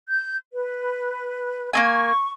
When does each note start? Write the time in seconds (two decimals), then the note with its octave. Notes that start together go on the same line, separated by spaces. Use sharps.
0.08 G6
0.53 B4
1.73 A#3 C4 G#5 C#6